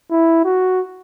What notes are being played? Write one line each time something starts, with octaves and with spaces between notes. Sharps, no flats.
E4
F#4